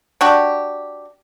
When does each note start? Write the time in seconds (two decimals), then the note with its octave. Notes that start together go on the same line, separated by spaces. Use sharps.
0.21 D4 F#4 G4